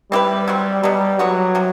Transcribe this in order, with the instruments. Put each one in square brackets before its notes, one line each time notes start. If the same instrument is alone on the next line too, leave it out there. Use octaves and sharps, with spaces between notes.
[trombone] G3 [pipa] C4 E4 G4 B4
[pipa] F#3 C4 F#4
[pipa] B2 F#3 B3 [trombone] G3
[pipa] E3 B3 F#4 [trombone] F#3
[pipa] C3 G3